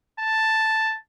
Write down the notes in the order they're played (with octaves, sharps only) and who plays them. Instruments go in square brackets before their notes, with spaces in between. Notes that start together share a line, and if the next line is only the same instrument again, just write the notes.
[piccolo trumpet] A5